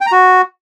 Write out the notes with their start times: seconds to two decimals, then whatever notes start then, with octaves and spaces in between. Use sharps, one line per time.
0.01 G5
0.06 A#5
0.12 F#4